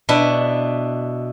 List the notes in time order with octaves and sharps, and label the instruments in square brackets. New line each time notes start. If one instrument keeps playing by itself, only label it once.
[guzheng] B2 D4 E4